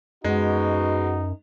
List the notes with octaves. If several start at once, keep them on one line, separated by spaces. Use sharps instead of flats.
F#2 G#3 B3 D#4 F#4